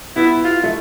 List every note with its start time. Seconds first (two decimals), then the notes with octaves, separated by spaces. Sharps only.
0.16 B3 E4
0.44 F4
0.64 A3